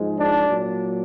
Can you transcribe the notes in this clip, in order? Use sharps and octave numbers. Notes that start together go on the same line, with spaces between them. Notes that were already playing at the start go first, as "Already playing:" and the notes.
Already playing: G#2 F3 G#3
D4
A#2 F#3